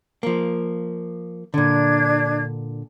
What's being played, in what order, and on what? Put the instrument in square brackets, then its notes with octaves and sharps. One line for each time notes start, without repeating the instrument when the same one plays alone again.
[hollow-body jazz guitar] F3 A#3
[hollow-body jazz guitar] A#2 D3 [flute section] D4 G#6